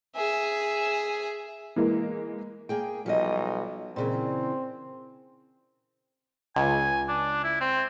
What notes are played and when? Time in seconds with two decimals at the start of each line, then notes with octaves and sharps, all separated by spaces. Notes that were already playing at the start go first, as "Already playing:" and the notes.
0.16 G#4 E5
1.76 E3 G#3 A#3
2.69 A#3 G#4 G5
3.06 B1 F3 G3 D#5
3.96 A#2 C#3 E3 C4
6.56 C#2 G#5
7.08 D4
7.44 E4
7.61 C4